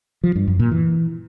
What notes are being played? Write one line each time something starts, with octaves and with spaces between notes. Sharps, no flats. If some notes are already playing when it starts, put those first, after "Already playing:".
F3
G2
F#2
A#2
E3